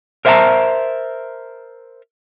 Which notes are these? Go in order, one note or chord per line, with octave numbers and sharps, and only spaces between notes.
A#4 C5 E5 F5 A5 A#5